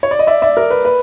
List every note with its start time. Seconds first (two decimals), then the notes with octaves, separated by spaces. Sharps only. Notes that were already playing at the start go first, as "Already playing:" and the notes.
0.03 C#5
0.11 D5
0.19 D#5
0.27 D5 E5
0.42 D5 E5
0.57 A#4
0.70 B4
0.85 B4